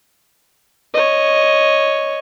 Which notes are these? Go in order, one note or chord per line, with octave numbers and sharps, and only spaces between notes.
C#5 D#5